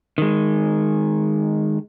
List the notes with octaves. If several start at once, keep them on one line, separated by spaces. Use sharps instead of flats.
D#3 G#3